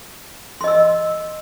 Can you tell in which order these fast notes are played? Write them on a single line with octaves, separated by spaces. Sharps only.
C6 D#5 E6